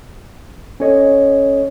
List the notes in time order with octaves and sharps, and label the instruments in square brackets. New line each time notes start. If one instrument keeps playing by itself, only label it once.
[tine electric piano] C#4 A4 C#5 D#5